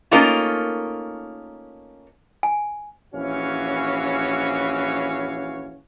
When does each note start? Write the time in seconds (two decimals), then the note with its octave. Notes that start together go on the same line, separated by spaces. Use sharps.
0.11 A3 A#3 C#4 D#4 F4 A#4
2.43 G#5
3.14 A#1 E3 C#4 F#4 C#5 F5